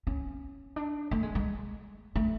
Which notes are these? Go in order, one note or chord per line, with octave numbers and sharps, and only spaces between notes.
C#4
D4
A3
G#3
G#3
A3